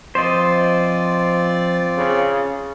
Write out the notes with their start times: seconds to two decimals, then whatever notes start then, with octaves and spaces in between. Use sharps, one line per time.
0.15 F3 C4 F4 C5 D5 D#5
1.98 C#3